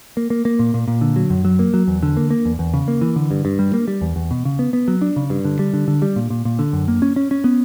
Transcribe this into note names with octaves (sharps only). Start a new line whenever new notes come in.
A#3
A#3
A#3
A#2
A#2
A#2
D3
F#3
F#2
F#3
A#3
F#3
E2
D3
A#3
A#3
E2
E2
C#3
A#3
E3
D3
G2
G2
G3
A#3
G3
E2
E2
B2
C#3
B3
B3
F#3
D4
C#3
G2
D3
G3
D3
D3
G3
A#2
A#2
A#2
D3
F#2
A#3
C#4
C#4
C#4
B3